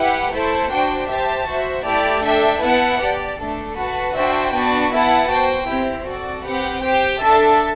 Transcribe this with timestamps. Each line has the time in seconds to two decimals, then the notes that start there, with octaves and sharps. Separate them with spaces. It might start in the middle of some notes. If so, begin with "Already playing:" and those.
Already playing: E4 G4 B4 F#5
0.31 A3 E4 A4 C5
0.70 D4 F#4 C5 G5
1.08 G4 C5 E5 A5
1.47 F#4 C5 E5
1.85 A3 E4 G4 D5 A5
2.23 D4 A4 E5 G5
2.61 B3 E4 B4 F#5 A5
3.00 G4 D5 A5
3.38 A3 D4 A4
3.76 F#4 B4 F#5 A5
4.14 D4 F#4 C5 E5 G5
4.53 B3 D4 F#4 B4
4.91 B3 E4 B4 F#5 A5
5.29 F#4 C5 G5
5.68 C4 E4 G4
6.06 F#4 A4 D5
6.44 C4 G4 B4 F#5
6.83 G4 C5 G5
7.21 D4 A4 E5 A5